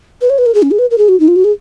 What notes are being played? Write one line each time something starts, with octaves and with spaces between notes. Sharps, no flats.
B4
C#5
B4
A#4
G#4
C#4
G#4
B4
A#4
G#4
F#4
D#4
F4
F#4
G#4